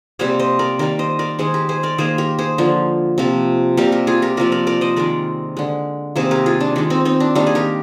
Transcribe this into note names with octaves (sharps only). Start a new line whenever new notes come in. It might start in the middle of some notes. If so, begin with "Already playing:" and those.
C3 G3 A#3 G#4 C5
C5 D#5
A#4 D5
D#3 G3 A#3 A#4 D5
C5 D#5
A#4 D5
D#3 G#3 G#4 C5
G4 A#4
G#4 C5
A#4 D5
D#3 A#3 G#4 C5
G4 A#4
G#4 C5
D3 F3 A#3
C3 F3 A#3
C3 G3 A#3 G4 A#4
G4 A#4
F4 G#4
G4 A#4
C3 F3 A#3 A#4 D5
A#4 D5
A#4 D5
C5 D#5
D#3 G#3 A#4 D5
D3 G#3
C3 D#3 A#3 G#4 C5
G4 A#4
F4 G#4
D4
D#3 G#3 D4
C4 D#4
C4 D#4
D4
D#3 G3 A#3 D4
G#4
G4 A#4